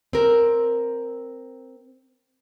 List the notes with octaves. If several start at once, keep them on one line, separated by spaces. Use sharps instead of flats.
C4 A#4